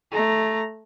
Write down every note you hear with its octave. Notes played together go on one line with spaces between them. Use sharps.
A3 A#5